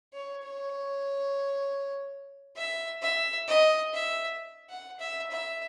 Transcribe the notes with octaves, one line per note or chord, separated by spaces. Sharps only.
C#5
C#5
E5
E5
D#5
E5
F#5
E5
E5